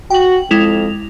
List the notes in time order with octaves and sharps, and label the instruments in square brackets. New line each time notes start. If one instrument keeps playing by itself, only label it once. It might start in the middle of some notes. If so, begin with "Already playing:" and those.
[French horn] F#4 [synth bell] G5 F#7
[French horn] F2 [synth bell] G#3 E4 F7